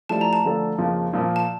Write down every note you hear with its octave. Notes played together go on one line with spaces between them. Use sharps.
F3 A3 E4 G4 D5 A5
A#5
A5
D3 F3 A3 D4 A4
F2 C#3 F3 A#3
A#2 F3 A#3
A5